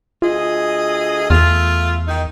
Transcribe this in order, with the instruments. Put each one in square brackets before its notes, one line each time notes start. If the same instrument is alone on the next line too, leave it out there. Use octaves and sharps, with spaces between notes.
[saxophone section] D2 G#4 D#5 [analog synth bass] F4
[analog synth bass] E2 [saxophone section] A3 F4
[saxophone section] D#3 D#4